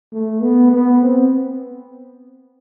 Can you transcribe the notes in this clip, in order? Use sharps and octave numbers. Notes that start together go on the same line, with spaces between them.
A3
B3
B3
C4